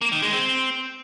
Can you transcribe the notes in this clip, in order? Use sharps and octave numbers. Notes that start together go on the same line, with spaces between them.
A#3
D#3
G#3
C4